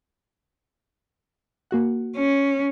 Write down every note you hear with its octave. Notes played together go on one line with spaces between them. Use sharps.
A#3 F#4 F#5
C#4